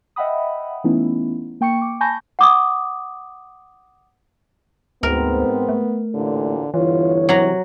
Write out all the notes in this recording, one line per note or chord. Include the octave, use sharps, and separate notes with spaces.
D#5 E5 F#5 G5 B5 D#6
E3 A3 B3 C#4 D#4 E4
A#3 G5 C#6 C#7
D6
G#5 A5 B5 C#6 G6 A#6
F#5 D6 D#6
D2 G#2 B3 C4 A#4
A3
A1 A#2 D3
G1 E3 E4 F4 C#5
C3 F#3 A#5